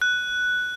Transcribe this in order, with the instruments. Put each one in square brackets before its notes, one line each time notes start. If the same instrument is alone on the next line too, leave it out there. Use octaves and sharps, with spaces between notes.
[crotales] F#6